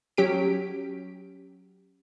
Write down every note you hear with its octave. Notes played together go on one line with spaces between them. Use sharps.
F#3 C#4 G4 B6 D7